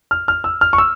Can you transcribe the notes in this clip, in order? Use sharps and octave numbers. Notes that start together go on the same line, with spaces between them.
F6
F6
E6
F6
C#6
E6